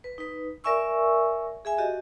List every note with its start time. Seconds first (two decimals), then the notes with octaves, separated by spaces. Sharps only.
0.04 B4
0.18 D#4 B4
0.64 A#4 D5 E5 G#5 C#6 E6
1.65 G#4 E5 G#5
1.78 F#4 G4 D#5